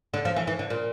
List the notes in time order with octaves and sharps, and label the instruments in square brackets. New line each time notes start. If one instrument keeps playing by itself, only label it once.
[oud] D3
F3
E3
E3
D3
A#2